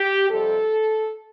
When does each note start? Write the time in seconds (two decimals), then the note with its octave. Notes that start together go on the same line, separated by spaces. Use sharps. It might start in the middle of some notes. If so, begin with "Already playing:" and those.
Already playing: G4
0.30 F2 C3 G3 A4